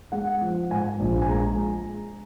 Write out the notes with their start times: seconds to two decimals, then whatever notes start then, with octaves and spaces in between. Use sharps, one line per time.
0.12 G#3 F#5
0.42 F3
0.71 G#2 G#5
1.00 A#1
1.22 G#5
1.29 G#3 A#5